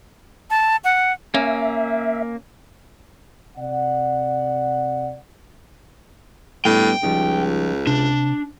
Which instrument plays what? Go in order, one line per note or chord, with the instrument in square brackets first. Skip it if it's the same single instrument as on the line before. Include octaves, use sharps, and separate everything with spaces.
[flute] A5
F#5
[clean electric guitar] A#3 [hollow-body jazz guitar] C#4 [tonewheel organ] E5
[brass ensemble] C3 D5 F#5
[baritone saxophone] A2 [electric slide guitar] G3 B3 D4 [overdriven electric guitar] G5
[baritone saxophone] C#2 [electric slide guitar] F3 G3 D#4
[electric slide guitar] C3 [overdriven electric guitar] D4